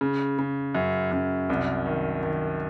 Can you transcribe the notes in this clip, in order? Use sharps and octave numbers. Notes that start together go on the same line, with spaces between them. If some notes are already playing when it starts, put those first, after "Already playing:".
C#3
C#3
F#2
F#2
C2
D#3
D#3